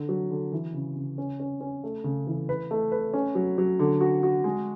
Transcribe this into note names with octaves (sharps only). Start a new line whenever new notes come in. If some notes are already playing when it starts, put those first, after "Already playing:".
Already playing: D3
F#3
D3
E3
C#3
C#3
C#4
C#4
C#4
A3
C#3
E3
B4
A3
B4
C#4
F#3
F#3
D3
F#4
F#4
G#3